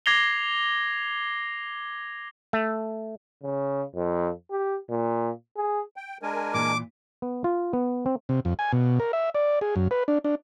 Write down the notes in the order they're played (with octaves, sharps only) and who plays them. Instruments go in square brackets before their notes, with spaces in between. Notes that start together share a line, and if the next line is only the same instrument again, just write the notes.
[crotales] D6 G#6 A#6 C7 F7 G7
[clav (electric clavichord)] A3
[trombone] C#3
F2
G4
A#2
G#4
[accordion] G5
[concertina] G#3 D4 [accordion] A#4 G#5
[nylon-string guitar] A#2 E3 [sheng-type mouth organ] D6
[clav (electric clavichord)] B3
F4
B3
C4
[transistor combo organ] C3
F2
G#5
B2
A#4
E5
D5
G#4
F#2
B4
D4
D4